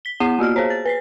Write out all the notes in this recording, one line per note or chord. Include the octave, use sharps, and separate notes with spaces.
B6 G7
B3 E4 F#5 C7 D#7 E7
A#3 F4 F#4 F6
G#4 C5 C#5
A6
B4 B6 C7